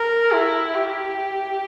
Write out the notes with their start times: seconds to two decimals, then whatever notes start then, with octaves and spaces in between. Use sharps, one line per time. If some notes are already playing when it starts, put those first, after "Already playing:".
Already playing: A#4
0.33 E4
0.75 G4